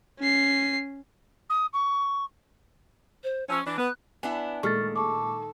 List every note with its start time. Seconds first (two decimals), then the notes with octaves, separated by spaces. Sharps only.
0.19 C#4 C7
1.49 D#6
1.73 C#6
3.24 C5
3.49 F3 C#4 E6
3.66 E3 D4 D6
3.78 B3 F#6
4.23 B3 D4 E4 G#5
4.63 A#2 D#3 G#3 A3 C#6 F6 A6
4.96 A4 C#6 D6